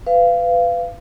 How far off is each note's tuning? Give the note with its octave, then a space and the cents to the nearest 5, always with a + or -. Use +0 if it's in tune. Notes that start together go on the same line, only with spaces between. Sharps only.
B4 +25 F5 -20